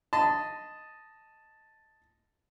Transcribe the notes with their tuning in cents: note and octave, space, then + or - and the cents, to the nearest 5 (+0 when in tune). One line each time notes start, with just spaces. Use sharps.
D#5 +0 A5 +0 C6 -35